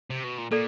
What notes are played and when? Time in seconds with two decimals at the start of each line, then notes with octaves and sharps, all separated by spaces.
0.10 C3
0.24 B2
0.38 A#2
0.51 A#2 A4 D5